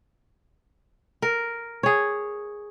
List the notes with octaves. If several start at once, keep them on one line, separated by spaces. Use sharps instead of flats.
A#4
G#4 C#5